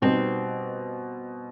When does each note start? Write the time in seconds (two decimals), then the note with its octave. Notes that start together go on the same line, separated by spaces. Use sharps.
0.02 B2 G3 B3 C4 D#4